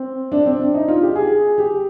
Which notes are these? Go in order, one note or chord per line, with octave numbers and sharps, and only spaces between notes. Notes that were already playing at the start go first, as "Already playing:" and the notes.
Already playing: C4
D4
C4
D4
D#4
F4
G4
G#4
G4